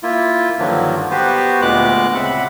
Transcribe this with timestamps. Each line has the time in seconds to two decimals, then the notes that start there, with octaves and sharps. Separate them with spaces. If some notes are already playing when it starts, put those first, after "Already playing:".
0.03 A#3 E4 F4
0.59 G2 D3 D#3 F3 F#3 A#3
1.11 B3 F#4 G4 B4 C5
1.62 D2 A#2 G#3 B3 D6 F#6
2.14 C#3 C4 E5 F#5 B5